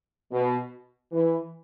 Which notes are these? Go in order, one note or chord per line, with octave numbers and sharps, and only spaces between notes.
B2
E3